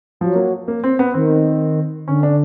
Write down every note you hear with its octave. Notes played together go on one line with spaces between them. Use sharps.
F3 F#3
A#3
A#3
C4
B3
D#3 C4
D3 C#4
D4